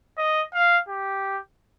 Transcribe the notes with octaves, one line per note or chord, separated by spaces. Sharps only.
D#5
F5
G4